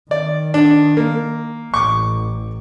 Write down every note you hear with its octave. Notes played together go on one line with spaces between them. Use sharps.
D#3 D5
D4
A#3
A1 C#6 D6